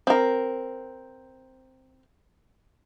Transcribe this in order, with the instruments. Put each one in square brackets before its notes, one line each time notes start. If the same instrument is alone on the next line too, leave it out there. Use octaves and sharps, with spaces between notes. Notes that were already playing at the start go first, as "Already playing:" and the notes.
[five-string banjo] C4 A#4